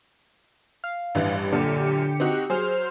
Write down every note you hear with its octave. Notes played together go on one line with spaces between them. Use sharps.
F5
A1 G2 E3
F#2 A#2 D3 G4 C#7
C4 D#4 F#4
F#3 G#4 C5 F6